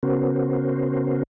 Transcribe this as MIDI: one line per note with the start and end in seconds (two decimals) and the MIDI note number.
0.03 1.23 49
0.03 1.23 59
0.03 1.23 61
0.03 1.23 66
0.03 1.23 70
0.03 1.23 72